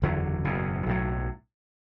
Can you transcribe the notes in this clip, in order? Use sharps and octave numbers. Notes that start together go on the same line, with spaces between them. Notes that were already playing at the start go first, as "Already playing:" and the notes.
F#1 E2 D3 F#3
F#1 E2 B2
B1 A2 F#3